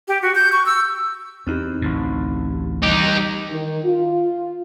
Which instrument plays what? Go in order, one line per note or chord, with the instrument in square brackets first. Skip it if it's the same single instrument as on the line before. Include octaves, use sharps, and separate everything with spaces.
[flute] G4
F#4
G6
C#6
E6
[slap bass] E2 [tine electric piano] C4 D#4 G4
[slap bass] A1 D2 A2
[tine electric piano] E3 G3 [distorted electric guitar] D#4 G4
[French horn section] D#3
F4